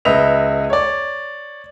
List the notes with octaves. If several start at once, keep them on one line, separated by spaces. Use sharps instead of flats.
C#2 B4 D#5 E5 F7
C#5 D5